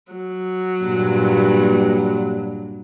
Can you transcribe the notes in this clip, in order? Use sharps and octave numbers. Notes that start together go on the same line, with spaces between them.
F#3
G2 A#2